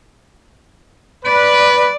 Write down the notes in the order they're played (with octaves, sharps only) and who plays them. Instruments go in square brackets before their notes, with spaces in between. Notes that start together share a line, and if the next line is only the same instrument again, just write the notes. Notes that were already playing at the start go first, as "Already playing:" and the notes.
[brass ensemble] B4 [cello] D5